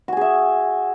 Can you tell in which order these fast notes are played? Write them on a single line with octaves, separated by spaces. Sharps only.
F#4 G#5 G#4 E5